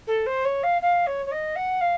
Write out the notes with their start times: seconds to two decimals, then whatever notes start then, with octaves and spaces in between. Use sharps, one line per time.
0.07 A4
0.26 C5
0.45 C#5
0.63 F5
0.82 F5
1.07 C#5
1.26 C#5
1.32 D#5
1.56 F#5
1.81 F5